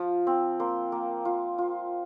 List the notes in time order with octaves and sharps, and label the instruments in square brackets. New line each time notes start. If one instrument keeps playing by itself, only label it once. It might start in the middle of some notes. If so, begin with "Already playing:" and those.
Already playing: [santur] F3 F4
C4
A#3 C6
A#3
F4
F4